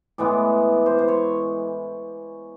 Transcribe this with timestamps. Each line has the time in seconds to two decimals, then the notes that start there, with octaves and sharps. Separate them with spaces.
0.18 A2 E3 G#3 B3 D5
0.86 C5
0.99 C5
1.08 C#5